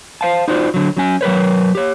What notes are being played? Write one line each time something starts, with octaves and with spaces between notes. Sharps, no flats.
C5 F5 A5
D#4 F4 F#4 C5 D5
D3 F#3
F#3 C#4 G#5
F#3 A#4 B4 C#5
G4 C#5